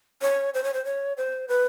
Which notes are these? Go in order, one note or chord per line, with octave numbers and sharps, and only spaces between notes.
C#5
C5
C#5
C5
C#5
C5
B4